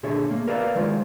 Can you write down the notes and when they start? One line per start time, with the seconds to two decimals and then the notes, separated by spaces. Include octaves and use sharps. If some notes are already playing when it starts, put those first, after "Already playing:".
0.03 A#2 D3 G#4 C#5 E5
0.31 A#3
0.47 F#4 A#4 B4 D5 E5 F5
0.75 D#3 F#3 G#3 F4 C5